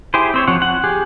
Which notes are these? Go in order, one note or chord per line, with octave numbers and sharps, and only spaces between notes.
E4 G4 G#4 C5
C4 C5 C#5
F3 C4 C#5 F#5
F#5
G4 G#4